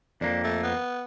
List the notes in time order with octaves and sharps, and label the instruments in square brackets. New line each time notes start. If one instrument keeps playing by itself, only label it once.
[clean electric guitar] F2 A#3 [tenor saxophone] D4
[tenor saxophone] A3
B3